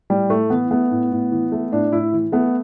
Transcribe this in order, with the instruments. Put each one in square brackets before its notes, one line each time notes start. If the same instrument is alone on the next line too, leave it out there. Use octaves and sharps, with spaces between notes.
[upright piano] A2 [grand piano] G3
[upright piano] A2 [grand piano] A3
[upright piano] E3 [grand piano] B3
[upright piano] A3 [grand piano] B3
[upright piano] A2
A2
E3
A3
[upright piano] A2 [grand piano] D4
[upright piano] A2 [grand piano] E4
[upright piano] E3
[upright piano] A3 [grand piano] B3